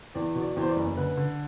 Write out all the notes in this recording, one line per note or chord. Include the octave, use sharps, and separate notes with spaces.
E2 D5
B2
D5
E2 C5
D5
F#1
D3 B4
D3